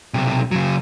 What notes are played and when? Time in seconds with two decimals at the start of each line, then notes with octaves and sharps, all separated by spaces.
0.14 B1 C3
0.52 C#3 F#3